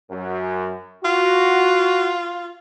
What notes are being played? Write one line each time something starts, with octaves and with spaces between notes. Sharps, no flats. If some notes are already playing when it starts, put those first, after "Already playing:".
F#2
F4 F#4